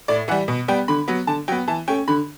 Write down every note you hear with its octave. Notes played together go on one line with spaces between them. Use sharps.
A2 D5
E3 G3 F#5
B2
G3 B3 G5
D3 B5
F#3 B3
D3 A5
F#3 B3 G5
E3 A5
A3 C#4 G5
D3 B5